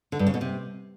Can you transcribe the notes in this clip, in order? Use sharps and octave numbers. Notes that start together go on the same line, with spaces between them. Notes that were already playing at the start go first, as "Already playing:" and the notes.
D3
G2
C#3
B2
C3